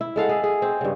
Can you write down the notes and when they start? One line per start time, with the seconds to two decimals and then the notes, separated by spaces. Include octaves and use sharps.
0.01 E4
0.16 G#3 A4 F5 F#5
0.29 G#4 E5
0.44 G#4
0.62 C4
0.81 G2 C#3